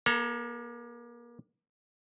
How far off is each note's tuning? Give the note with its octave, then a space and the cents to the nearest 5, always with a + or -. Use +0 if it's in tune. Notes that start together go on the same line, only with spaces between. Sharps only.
A#3 +35 A4 +0 A#5 +0